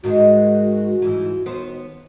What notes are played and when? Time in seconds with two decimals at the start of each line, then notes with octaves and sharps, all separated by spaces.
0.04 G#2 D#3 G#3 F#4
1.02 G#2 E3
1.46 D#2 B3 C5